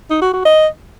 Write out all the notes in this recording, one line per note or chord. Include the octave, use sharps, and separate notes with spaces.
D#4
F#4
F#4
D#5